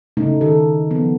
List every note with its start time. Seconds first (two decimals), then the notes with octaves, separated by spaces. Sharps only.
0.17 C#3 A3 D#4 E4
0.41 D#3 G#4 A4
0.91 F3 B3